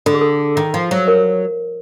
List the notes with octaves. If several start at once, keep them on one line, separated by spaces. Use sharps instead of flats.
D3 A4
G#4
A4
D#3
F3
F#3
A#4